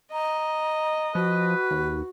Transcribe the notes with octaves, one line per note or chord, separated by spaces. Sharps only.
D#5 A#5
F3 F#4 B4
D#2